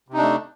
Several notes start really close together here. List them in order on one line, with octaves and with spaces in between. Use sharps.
C3 D#4 D4 A3